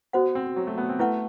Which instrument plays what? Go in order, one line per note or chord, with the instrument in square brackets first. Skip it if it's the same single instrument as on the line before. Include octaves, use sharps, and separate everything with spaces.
[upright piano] B3 [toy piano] F#4 C5 F#5
[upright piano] C4
F#3
A3
B3
C4
[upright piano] A3 [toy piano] E4 B4 F#5